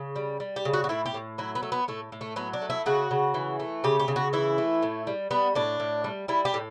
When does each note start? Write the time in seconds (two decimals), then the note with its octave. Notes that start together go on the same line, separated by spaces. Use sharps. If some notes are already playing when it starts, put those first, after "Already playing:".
Already playing: C#3
0.16 G3
0.40 G3
0.56 G4
0.65 C#3
0.73 F#4
0.84 F#4
0.89 A2 E4
1.06 G4
1.14 A2
1.38 F#3 E4
1.55 B3
1.63 A3
1.72 B3
1.88 A2 A3
2.12 A2
2.21 A3
2.36 F#3 B3
2.53 D4
2.62 A3
2.70 E4
2.86 C#3 F#4
3.11 C#3
3.34 E3
3.60 A3
3.84 C#3 G4
4.00 G4
4.08 C#3
4.16 F#4
4.33 E3 E4
4.58 A3
4.82 A2
5.07 G3
5.31 G3 B3
5.55 A2 D4
5.80 A2
6.04 G3
6.28 G3 E4
6.45 G4
6.54 A2